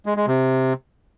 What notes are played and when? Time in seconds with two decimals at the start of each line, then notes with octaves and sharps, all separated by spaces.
0.06 G#3
0.17 G#3
0.27 C3